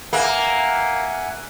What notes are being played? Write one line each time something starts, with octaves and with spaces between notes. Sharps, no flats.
A#3 E5 F#5 G#5